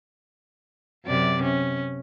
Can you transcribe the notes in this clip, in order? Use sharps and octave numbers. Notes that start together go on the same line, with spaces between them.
F#2 C3 D5
C#4